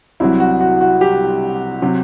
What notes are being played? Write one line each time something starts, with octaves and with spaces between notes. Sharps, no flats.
C2 C3 F#3 E4
F#4
F#4
F#4
G4
C3 F#3